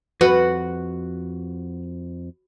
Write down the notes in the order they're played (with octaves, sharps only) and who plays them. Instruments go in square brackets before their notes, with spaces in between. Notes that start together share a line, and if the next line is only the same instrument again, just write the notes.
[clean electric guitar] F2 [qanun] F#4 [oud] B4